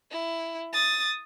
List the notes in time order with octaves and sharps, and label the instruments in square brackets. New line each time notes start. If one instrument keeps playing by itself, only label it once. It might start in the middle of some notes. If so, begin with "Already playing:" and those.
[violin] E4
D#6 A6